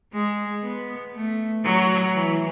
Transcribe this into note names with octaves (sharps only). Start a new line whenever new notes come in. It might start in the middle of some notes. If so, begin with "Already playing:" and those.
G#3
B3
A3
F#3
E3